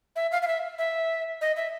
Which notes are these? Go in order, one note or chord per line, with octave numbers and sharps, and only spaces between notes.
E5
F5
F5
E5
E5
D#5
E5